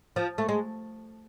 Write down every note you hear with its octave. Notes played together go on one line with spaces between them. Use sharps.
F3
A3
G#3